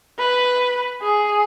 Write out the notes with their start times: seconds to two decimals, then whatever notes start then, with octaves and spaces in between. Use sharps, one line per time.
0.19 B4
1.01 G#4